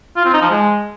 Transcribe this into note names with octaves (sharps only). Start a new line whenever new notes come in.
F4
C4
D#4
F3
G#3